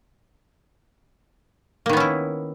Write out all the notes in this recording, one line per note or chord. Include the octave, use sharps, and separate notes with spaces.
D#3 A#3 B3 C#4 E4